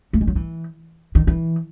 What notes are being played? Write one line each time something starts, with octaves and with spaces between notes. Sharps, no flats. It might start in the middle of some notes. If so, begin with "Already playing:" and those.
A3
G#3
F#3
E3
D#3
E3